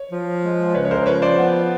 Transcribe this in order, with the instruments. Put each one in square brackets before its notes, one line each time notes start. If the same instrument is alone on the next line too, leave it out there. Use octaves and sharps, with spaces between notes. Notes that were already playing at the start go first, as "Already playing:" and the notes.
Already playing: [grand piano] C#5
[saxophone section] F3
G#3
[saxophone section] C#3 [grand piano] B4 C#5
[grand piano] C#5
A#4 C5
[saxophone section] F3 [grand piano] B4 C#5
[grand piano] C5 D5
[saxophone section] B3